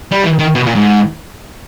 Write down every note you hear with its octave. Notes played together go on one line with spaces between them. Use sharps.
G3
E3
D#3
B2
A#2
G#2